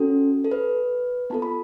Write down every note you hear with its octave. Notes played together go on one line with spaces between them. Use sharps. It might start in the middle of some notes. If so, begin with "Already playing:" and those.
Already playing: C#4 F#4 A4
A4
B4
B3 F4 A4 A5
B5